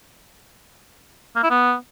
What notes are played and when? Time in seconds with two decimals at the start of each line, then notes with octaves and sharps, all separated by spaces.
1.36 A#3
1.43 E4
1.50 B3